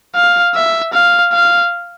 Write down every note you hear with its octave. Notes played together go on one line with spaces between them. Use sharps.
F5
E5
F5
F5